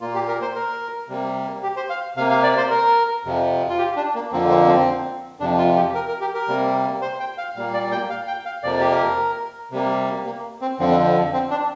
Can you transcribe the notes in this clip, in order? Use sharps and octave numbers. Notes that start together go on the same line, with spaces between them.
A#2 A#3 F4
G4
A#4
C5
A#4
C3 G3 A#3
G4
C5
F5
C3 A#3 F5
F5
D5
C5
A#4
F2 C3 F3
F4
G4
D4
A#3
F2 D3 F3 A#3 C4
C4
C4
F2 C3 F3 D4
F4
G4
A#4
A#4
G4
A#4
C3 G3 A#3
C5
G5
F5
A#2 G3 A#3 F5
D5
G5
F5
G5
F5
F2 C3 F3 A#3 D5
G4
A#4
C3 G3 A#3
A#3
C4
F2 D3 F3 C4
C4
D4